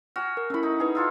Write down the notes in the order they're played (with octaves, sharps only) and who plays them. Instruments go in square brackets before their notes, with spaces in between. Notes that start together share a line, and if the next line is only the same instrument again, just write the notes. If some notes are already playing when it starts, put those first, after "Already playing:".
[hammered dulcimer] F#4 G#5 [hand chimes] F6
[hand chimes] A#4
[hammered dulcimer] A3 B5 [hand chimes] C#4 E4
[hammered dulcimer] D#4
[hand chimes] D#4 B4 [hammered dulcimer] G#4
[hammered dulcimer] E4 F4 A4